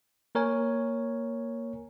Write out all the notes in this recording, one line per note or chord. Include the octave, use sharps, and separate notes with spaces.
A#3 A#4 C#5 G#5